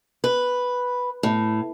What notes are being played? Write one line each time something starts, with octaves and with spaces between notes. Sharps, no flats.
B4
A2